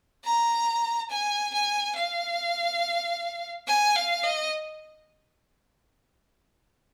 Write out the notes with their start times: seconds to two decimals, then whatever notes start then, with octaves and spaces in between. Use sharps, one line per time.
0.24 A#5
1.10 G#5
1.53 G#5
1.96 F5
3.67 G#5
3.96 F5
4.24 D#5